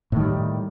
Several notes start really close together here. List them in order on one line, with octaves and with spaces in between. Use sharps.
A2 D#3 G3